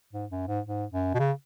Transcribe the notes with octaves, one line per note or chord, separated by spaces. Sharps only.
G#2
F#2
G#2
G#2
F#2
B2
C#3